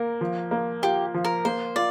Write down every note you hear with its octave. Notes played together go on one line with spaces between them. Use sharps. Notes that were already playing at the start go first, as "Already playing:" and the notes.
Already playing: A#3 A#4
F3
A#3
F4 G4
F3
A#4
A#3 C5
F4 D5